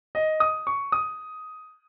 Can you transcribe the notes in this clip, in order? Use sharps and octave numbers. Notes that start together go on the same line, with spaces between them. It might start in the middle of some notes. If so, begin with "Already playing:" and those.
D#5
D#6
C#6
D#6